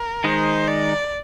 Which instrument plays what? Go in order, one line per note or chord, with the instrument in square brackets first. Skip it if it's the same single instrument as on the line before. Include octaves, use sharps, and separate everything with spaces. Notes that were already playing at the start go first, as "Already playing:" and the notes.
Already playing: [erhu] A#4
[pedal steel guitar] D#3 G#3 D#4 [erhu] C5
[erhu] D5